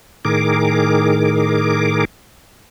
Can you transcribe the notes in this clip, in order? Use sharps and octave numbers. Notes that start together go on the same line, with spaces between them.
A2 D#3 G#4 A#4 D6